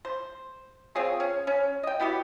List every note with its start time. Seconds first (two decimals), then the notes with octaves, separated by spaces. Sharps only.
0.05 C5
0.95 C4 F4 G#4 C#5
1.20 C#4
1.47 C#4
1.83 D#5 G5
2.00 B3 E4 F#4 G4